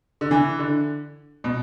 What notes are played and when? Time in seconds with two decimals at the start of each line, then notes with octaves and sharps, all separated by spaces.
0.21 D3
0.31 E3
0.59 D3
1.44 B2